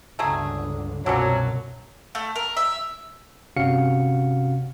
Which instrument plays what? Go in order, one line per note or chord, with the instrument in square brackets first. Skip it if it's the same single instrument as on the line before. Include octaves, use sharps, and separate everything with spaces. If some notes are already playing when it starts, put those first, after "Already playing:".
[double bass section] G1 C#2 D3 [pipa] F#3 A3 G#4
[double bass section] C2 F#2 B2 [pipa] D3 F3 C#4 [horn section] F#3
[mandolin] A3
A#4
E5
[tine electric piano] G1 C3 C#4 F#4 F5 C#7